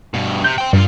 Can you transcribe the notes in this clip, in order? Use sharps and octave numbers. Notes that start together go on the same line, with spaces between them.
G2 B2
C3 G6
G5 C6
G2 A#2 F4